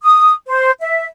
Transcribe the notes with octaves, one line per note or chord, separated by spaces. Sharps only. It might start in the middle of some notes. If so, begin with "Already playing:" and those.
D#6
C5
E5